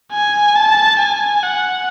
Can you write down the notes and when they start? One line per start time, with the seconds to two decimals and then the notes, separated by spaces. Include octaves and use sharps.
0.12 G#5
0.56 A5
0.99 G#5
1.44 F#5